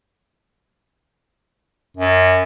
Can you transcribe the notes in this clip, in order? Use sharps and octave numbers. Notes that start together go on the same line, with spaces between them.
F#2